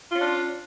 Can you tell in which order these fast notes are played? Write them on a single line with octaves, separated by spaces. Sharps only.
F4 C#4 D4